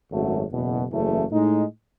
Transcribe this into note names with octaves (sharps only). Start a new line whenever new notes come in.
G#1 F#2 C#3 F#3 A3
F#1 E2 B2
F#1 E2 C#3 E3 A3
A2 G#3 D#4